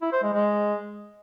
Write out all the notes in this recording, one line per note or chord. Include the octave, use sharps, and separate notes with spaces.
E4
C5
G#3
G#3